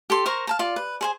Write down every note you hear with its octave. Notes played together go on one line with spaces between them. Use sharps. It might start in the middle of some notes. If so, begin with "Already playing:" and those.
G4 A4 C6
A#4 C5 A#5 C#6
F5 A5 A#5
F4 D5
B4
G#4 C5 G#5